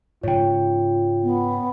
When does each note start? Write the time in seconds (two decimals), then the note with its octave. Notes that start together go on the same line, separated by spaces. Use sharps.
0.23 G#2 C#3 F4 C#5 G5
1.23 B3